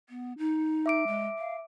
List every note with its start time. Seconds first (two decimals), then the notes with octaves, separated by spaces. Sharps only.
0.09 B3
0.38 D#4
0.86 E5 D6 D7
1.07 G#3
1.38 F5